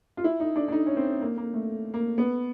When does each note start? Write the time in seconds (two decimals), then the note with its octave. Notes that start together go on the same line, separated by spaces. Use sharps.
0.17 F4
0.24 E4
0.40 D#4
0.56 D4
0.68 D4
0.72 D#4
0.86 C#4
0.97 C4
1.21 A#3
1.37 A#3
1.54 A3
1.94 A#3
2.18 B3